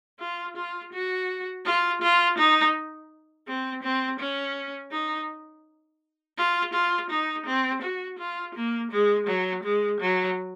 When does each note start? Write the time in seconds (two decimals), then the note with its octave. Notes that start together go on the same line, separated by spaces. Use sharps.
0.20 F4
0.57 F4
0.92 F#4
1.66 F4
2.02 F4
2.38 D#4
3.48 C4
3.83 C4
4.20 C#4
4.92 D#4
6.38 F4
6.73 F4
7.10 D#4
7.46 C4
7.82 F#4
8.19 F4
8.55 A#3
8.91 G#3
9.27 F#3
9.64 G#3
10.01 F#3